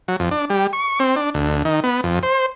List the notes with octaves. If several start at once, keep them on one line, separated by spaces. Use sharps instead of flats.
F#3
F2
D4
G3
C#6
C4
D4
D2
D#3
B3
F2
C5